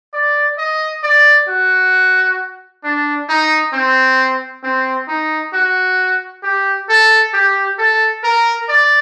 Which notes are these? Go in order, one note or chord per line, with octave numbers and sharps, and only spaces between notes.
D5
D#5
D5
F#4
D4
D#4
C4
C4
D#4
F#4
G4
A4
G4
A4
A#4
D5